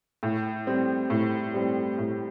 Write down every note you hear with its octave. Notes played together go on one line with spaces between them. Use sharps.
A2
G3 C4
A2
G3 C4
A2